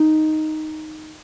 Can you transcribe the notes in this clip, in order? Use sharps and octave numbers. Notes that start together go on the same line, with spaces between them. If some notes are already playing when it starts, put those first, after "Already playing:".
Already playing: D#4